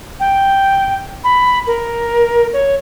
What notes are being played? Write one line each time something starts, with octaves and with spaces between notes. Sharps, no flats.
G5
B5
A#4
C#5